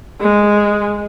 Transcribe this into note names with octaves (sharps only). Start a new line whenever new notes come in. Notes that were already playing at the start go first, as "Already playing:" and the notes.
G#3